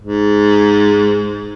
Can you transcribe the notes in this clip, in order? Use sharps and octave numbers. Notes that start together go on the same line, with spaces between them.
G#2